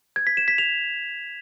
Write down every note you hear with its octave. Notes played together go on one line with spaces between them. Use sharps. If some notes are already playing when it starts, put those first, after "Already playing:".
G#6
B6
E7
B6
F7